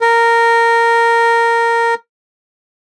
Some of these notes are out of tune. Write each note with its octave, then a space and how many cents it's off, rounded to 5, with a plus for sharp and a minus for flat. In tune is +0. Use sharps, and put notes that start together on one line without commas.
A#4 -10